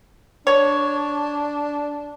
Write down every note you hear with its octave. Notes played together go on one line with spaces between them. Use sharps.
D4 C#5